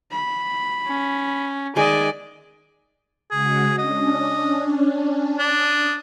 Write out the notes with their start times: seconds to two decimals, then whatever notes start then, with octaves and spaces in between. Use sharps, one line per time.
0.11 B5
0.87 C#4
1.76 D#3 G#3 D5 D#5 G#5
3.31 C#3 G#3 F#4 G#4
3.78 C#4 D4 D#5
5.39 D4 D#6